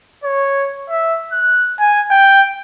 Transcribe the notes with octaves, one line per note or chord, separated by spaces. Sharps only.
C#5
E5
F#6
G#5
G5